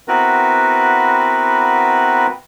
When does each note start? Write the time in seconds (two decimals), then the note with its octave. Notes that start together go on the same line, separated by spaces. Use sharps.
0.08 B3 C4 E4 F#4 A#4 B4